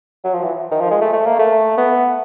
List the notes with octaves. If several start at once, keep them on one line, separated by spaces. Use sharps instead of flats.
F#3
F3
E3
D#3
F3
G#3
A3
A3
A#3
A3
B3